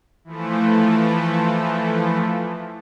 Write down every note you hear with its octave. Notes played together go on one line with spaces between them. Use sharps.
E3 F3 A3